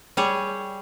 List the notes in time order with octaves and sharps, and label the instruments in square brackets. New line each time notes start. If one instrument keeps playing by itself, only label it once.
[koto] G3 G#4 C#5